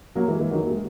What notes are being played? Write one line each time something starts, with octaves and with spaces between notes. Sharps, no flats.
F#3 A#3
E3 G#3
E3 G#3
D#3 F#3
A#3
G#3